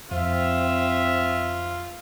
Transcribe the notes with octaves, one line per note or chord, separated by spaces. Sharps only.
F2 C4 F4 E5